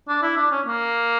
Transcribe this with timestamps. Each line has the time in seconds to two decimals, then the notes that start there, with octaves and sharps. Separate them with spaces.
0.08 D4
0.22 E4
0.37 D4
0.51 C#4
0.66 A#3